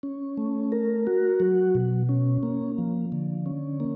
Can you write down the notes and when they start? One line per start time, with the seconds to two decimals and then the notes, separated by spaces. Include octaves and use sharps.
0.03 C#4
0.38 A3
0.72 A#4
1.07 F#4
1.40 F#3
1.75 B2
2.09 C#4
2.43 A#3
2.78 F3
3.12 D3
3.46 C#4
3.80 A#3